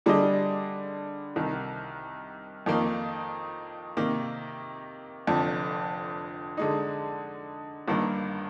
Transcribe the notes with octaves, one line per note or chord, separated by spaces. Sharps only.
D3 G3 D4 G#4 D#5
C2 C3 D#3
F2 D#3 A#3
C3 D#3 A#3
F1 F2 D3
D3 G#3 D#4
G1 G2 D#3 A#3